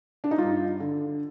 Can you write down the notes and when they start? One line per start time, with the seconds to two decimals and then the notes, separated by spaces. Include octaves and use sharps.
0.24 D4
0.31 D#4
0.38 G2 F4
0.80 D3